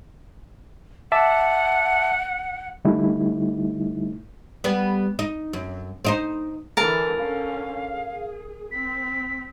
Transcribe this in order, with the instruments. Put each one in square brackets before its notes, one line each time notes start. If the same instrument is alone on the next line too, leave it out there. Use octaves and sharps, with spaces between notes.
[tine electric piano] E5 A5 D6 [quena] F#5
[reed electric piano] D3 G3 A3 D#4 E4
[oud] G3 B3
D#4
F#2
C4 D#4 C5
[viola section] D3 E3 [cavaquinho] A#4 A5
[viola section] D3 C#4 [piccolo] F5
[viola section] G#4
[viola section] C4 [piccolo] B6